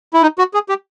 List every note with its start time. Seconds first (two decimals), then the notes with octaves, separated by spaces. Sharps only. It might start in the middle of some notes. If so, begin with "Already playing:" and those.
0.14 E4
0.22 D#4
0.38 F#4
0.54 G#4
0.69 G4